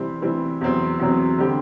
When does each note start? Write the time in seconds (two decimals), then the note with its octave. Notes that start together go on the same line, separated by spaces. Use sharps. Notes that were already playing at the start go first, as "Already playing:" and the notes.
Already playing: C3 E3 G3 C4
0.22 C3 E3 G3 C4
0.61 E2 C3 F#3 C4
0.99 E2 C3 F#3 C4
1.38 D3 G3 C4 G4